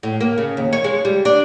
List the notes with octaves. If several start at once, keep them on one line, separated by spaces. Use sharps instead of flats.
A2
A#3
C#3
D#2
C#5
G#3
G3
D4